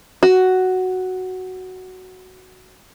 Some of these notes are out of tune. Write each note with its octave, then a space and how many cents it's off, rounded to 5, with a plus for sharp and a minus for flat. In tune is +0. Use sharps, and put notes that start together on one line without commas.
F#4 +5